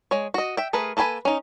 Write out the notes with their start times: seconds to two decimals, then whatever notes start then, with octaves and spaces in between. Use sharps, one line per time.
0.11 G#3 C#5
0.34 F#4 D#5
0.57 E5 G5
0.73 A3 G#4 A#4 B4
0.97 A#3 A4 B4 G#5 B5
1.25 C#4 D#4